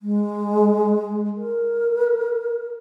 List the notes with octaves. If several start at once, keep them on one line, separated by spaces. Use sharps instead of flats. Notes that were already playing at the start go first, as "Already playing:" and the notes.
G#3
A#4